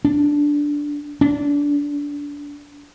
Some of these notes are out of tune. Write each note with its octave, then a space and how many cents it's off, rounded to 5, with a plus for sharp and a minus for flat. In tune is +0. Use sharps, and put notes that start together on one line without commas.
D4 -5
D4 -20